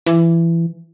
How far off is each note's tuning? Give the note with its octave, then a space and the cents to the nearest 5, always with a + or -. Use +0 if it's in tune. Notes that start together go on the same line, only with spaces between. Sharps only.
E3 +20